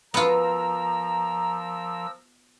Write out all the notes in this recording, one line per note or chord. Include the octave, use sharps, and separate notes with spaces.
F3 B3 F4 A#4 A#5 E6